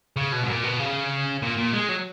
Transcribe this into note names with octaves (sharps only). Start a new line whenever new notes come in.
C#3
B2
G#2
A#2
B2
C#3
A#2
A#2
G#3
F#3